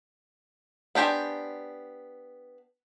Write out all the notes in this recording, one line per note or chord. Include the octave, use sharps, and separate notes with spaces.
B3 D4 G4 C5 G#5